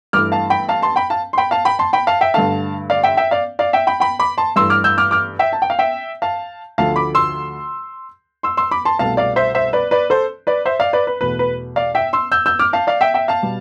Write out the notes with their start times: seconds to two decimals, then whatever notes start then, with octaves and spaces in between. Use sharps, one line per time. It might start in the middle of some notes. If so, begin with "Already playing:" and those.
0.13 G2 E3 A3 D6 F6
0.32 F5 A5
0.50 G5 B5
0.69 F5 A5
0.82 A5 C6
0.96 G5 B5
1.10 F5 A5
1.33 C6
1.38 G5 B5
1.51 F5 A5
1.65 G5 B5
1.79 A5 C6
1.93 G5 B5
2.07 F5 A5
2.21 E5 G5
2.34 G2 D3 A3 F5 A5
2.90 D5 F5
3.04 E5 G5
3.17 E5 G5
3.31 D5 F5
3.59 D5 F5
3.73 E5 G5
3.87 G5 B5
4.00 G5 B5
4.19 B5 D6
4.38 A5 C6
4.56 G2 E3 A3 C6 E6
4.70 D6 F6
4.84 E6 G6
4.98 D6 F6
5.11 D6 F6
5.39 E5 G5
5.53 A5
5.62 G5
5.70 F5
5.79 E5 G5
6.22 F5 A5
6.78 D2 D3 F3 A3 F5 A5
6.96 B5 D6
7.15 C6 E6
8.43 C6 E6
8.57 C6 E6
8.71 B5 D6
8.85 A5 C6
8.99 C2 B2 A3 F5 A5
9.17 D5 F5
9.36 C5 E5
9.55 C5 E5
9.73 B4 D5
9.91 B4 D5
10.10 A4 C5
10.47 B4 D5
10.66 C5 E5
10.79 D5 F5
10.93 B4 D5
11.07 B4
11.21 E2 B2 A3 B4
11.39 B4
11.76 D5 F5
11.95 E5 G5
12.13 C6 E6
12.32 E6 G6
12.46 E6 G6
12.59 D6 F6
12.73 F5 A5
12.87 D5 F5
13.01 E5 G5
13.14 E5 G5
13.28 F5 A5
13.43 B2 G3